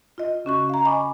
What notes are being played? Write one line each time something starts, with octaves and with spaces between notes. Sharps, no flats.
F4 D#5
C#3 C#4 F#4 C#6
F5 A#5
D#5 G#5 B5 C#6 D6